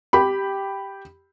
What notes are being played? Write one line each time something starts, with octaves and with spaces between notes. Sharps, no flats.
G4 B5